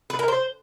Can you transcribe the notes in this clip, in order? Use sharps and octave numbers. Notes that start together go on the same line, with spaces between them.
B4
A#4
C5